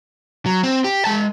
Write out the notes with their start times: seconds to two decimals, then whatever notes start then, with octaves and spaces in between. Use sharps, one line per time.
0.46 F#3
0.63 C4
0.84 G4
1.05 G#3 A5